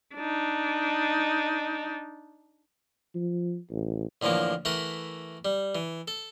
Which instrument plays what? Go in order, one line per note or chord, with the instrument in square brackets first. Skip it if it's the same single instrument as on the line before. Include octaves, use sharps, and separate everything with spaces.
[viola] D4 D#4
[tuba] F3
A1
[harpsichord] A2 D3 E3 F3 A#3
E3 A3 A#4 F#5 B5
G3
E3
A4